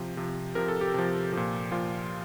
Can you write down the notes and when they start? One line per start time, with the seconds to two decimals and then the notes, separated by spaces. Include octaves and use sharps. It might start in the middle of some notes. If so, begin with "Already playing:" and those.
Already playing: C3 F3
0.17 C3 F3
0.55 C3 F3 A#4
0.68 A4
0.81 G4
0.94 C3 F3
1.33 A#2 F3
1.72 A#2 F3 F4